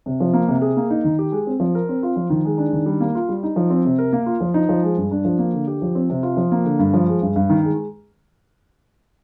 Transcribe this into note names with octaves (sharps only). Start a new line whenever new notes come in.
C3
F3
A#3
C3
G#4
A#3
D#4
D#3
G4
G#3
C4
F3
A#4
C4
F4
F3
D#3
G#3
D4
D#3
G3
A#3
F4
G3
D#4
F3
C4
C3
A#4
A#3
F4
F3
D#4
F3
G#3
G2
D4
F3
A#3
D3
G4
F3
C4
C3
F4
F3
A#3
D3
G2
F3
G#3
G2
G2
D#3
G#3